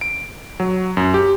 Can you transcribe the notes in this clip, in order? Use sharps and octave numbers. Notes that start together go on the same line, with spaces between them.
D7
F#3
F#2
G4